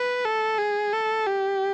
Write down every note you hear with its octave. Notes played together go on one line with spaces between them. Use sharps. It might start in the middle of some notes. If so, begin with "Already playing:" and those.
Already playing: B4
A4
G#4
A4
G4